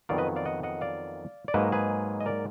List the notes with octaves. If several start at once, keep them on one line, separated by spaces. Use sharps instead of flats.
F2 D#3 F#3 B3 D5 F5
B4 D#5
D5 F5
D#5 F#5
D#5 F#5
D5 F5
D5
G#2 F#3 A#3 B4 D#5
G#4 B4
D#5
A#4 D5